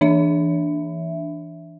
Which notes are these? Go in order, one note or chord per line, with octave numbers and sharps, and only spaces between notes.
E3 D4 E5